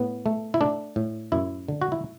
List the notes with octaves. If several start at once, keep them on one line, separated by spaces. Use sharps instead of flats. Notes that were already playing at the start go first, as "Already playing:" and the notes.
Already playing: A2 B3
A3
E4
A3 D4
A2
F#2 E4
D3
F#4
E4